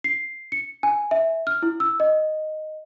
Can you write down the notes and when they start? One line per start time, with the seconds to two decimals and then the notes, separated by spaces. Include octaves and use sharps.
0.04 C7
0.52 C#7
0.83 G#5
1.11 E5
1.47 F6
1.62 E4
1.80 E6
2.00 D#5